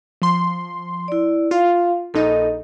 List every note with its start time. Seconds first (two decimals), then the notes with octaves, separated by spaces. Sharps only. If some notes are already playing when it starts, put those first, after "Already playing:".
0.22 F3 C6
1.08 E4 D5
1.51 F4 F5
2.14 A#1 D#4 A4 D#5